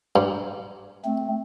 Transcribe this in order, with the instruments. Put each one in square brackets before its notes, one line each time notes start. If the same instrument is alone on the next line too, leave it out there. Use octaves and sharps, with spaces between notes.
[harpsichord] G2
[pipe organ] A3 C4